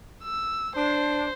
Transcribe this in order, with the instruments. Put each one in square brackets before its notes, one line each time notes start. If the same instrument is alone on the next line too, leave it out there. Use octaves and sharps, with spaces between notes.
[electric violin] E6
[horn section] D4 [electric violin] C5